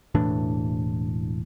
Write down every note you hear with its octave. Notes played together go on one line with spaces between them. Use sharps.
E1 A2 E3 D4